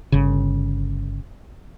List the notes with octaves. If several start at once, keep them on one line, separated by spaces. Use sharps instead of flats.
G1 C#3